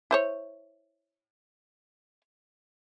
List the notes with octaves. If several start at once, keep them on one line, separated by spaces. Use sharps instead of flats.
E4 C5 C#5